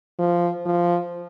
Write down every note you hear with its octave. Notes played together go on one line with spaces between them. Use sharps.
F3
F3